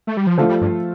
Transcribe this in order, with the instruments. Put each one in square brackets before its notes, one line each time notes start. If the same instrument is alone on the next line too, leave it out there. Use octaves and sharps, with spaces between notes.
[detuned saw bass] A3
G3
F3
[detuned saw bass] D3 [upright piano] F3 A3 F4 A4 C5
[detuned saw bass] G3
G2